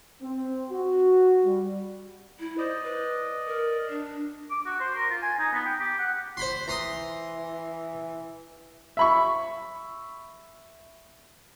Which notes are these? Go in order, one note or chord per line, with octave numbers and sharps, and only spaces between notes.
C4
F#4
G3
E4
C5 D5 D#5
B4
A#4
D4
D6
F#4
C5
A#4
F4
G#5
D#4
B3
G5
G4
F#5
C5 B5 C6
E3 A#5 C6 D#6
E5 B5 C#6